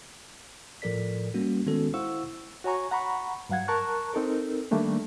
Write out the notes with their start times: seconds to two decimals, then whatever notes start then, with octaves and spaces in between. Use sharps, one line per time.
0.82 A2 F3 A4 A#4 D5 B6
1.34 G3 A#3 C#4 F#4
1.66 D#3 G#3 B3 C#4 F#4 A4
1.94 E4 C5 F5 F#5 C#6 E6
2.64 F#4 C#5 G#5 A#5 C#6
2.91 F#5 A#5 B5 C#6
3.49 G2 F#3 F5 F#5 G#6
3.68 A#4 A5 A#5 C#6 F#6
4.14 C4 D#4 A4 A#4
4.71 D#3 G3 A3 A#3 D4